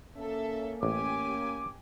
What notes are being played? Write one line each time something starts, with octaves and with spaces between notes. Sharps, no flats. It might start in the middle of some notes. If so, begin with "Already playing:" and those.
A#3 C#4 A4 E5
A1 G4 G#5 D6